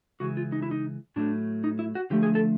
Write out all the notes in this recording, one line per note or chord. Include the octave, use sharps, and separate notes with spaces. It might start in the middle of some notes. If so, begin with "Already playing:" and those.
C#3 E3 G#3 F#4
F4
D#4
E4
D#4
A2 F#3 A3 D4
D#4
E4
F#4
D3 F3 A3 G4
G#4
A4